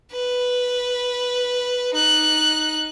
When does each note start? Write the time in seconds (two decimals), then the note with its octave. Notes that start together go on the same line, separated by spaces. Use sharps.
0.12 B4
1.95 D#4 F#6